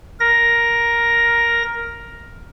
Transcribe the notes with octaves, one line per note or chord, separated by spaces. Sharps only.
A#4 A#6